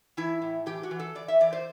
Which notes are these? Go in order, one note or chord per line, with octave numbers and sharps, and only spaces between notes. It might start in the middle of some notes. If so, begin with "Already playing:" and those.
E3 E4
A2
E3 G4
F#4
E3
A4
E3 D5
E5
E3 D5
C5